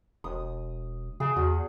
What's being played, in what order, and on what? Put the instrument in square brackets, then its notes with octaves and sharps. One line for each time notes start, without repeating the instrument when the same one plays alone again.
[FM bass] E1 [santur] D#6
[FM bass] C#3 [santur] G#4
[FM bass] E2 [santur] F#4